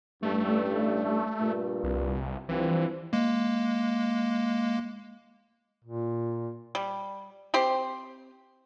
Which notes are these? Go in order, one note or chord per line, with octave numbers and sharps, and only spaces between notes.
A1 G2 A3
G2 A#2
C2
G2 E3 F3 C4
G#3 A#3
A#2
G3
C4 G4 C5